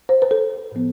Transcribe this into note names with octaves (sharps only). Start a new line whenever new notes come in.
C5
B4
A4
A2 F3 B3